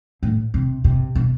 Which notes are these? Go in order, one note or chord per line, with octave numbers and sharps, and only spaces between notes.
A2
C3
C3
B2